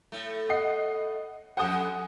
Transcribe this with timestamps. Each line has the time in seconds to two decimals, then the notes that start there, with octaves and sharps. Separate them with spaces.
0.12 A2 A3
0.49 D#5 F#5 C7
1.57 F2 A4 C5 F#5 G#5 D#6